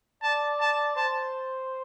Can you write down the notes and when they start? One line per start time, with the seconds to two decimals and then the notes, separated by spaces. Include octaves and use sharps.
0.23 D5 A5
0.61 A5
0.96 C5 A5